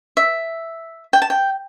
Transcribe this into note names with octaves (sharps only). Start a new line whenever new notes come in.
E5
G5
A5
G5